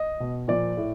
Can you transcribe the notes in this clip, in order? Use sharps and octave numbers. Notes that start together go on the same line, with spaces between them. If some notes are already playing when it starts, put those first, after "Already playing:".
Already playing: D#5
B2
A#2 F3 D5
A2